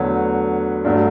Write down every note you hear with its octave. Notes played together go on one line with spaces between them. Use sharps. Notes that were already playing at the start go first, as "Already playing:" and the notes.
Already playing: E2 D3 F#3 A3 B4 C#5
G2 F#3 A3